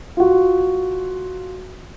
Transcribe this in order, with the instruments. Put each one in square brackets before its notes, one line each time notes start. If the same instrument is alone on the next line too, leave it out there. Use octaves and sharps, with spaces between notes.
[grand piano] F4 F#4